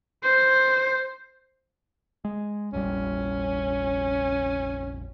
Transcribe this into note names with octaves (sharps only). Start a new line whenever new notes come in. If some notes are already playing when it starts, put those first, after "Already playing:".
C5
G#3
F1 A#1 G3 C#4